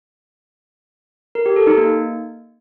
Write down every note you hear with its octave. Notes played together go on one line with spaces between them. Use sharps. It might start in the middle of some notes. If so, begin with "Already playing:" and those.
A#4
G4
A4
D#4
A#3